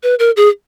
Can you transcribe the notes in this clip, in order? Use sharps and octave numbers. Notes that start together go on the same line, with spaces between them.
B4
A#4
G#4